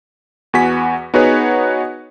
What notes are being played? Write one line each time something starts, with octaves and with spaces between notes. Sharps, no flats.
E2 B3 F#4 G#5 B6
B3 D#4 F#4 G#4 B4 C#5